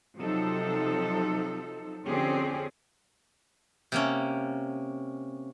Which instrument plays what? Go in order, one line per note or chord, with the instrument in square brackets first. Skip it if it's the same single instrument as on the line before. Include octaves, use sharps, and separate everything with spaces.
[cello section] C3 F3 F#3 D#4 A4
F2 D3 C4 C#4 G4 G#4
[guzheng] C3 A#3 C#4